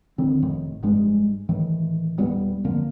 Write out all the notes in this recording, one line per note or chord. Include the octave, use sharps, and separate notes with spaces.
D1 D3 D#3 C4
F1 F2 A2 D#3
F1 G2 G3 G#3
A2 D#3 E3
D#1 G3 B3
F2 D3 A#3